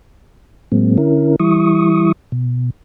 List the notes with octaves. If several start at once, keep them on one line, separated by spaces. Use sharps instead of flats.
A2 F#3 G#3 A#3 C4
D3 C#4 E4 A#4
E3 G3 E4 C#6 D#6
B2